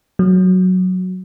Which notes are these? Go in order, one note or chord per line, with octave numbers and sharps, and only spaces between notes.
F#3